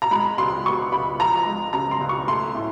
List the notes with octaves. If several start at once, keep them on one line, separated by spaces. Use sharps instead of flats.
A#5
G#3 B5
C#2 C6
B2 C#6
C#2 B5
F3 A#5
G#3
C#3 A#5
C6
C#2
C#6
A3 C6
A2